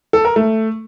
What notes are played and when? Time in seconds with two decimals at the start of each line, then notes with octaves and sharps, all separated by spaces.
0.13 A4
0.25 A#4
0.36 A3